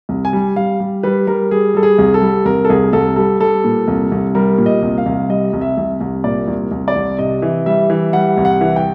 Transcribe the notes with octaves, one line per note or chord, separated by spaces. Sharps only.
C2
G#5
G3
G3 F5
G3
G3 B4
G3 A#4
G3 G#4
G3 A4
G#4
C2
A4
G3
C2 A#4
A4
C2 G#4
C2 A4
G3 A4
G3 A4
A#2
C2
C2
G3 A#4
A#2
D#5
C2
F5
C2
G3 D#5
C2
E5
C2
C2
A#2 D5
C2
C2
D5
C2
C3 D#5
E3
G3 E5
E3
G3 F#5
C2
F#5
E3
G5